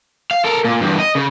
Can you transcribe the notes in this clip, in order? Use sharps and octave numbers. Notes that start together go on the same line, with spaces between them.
F5
A4 A#4
A#2
E2 G2
D#5
C#3